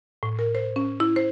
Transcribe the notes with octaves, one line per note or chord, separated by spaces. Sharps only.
A2
A#4
C5
C#4
E4
C5